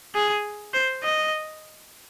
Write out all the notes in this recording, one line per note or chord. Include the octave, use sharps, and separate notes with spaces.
G#4
C5
D#5